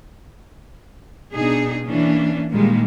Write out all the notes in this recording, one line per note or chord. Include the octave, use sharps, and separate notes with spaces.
B2 D4 D#4 G#4
E3 A#3 C#4 D4
A#2 D#3 G3 G#3 A#3